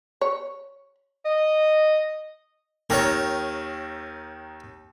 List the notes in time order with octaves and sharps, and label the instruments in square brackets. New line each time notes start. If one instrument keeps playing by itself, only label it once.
[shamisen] C#5
[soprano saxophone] D#5
[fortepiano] D#2 D#3 [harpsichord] A#4 C#5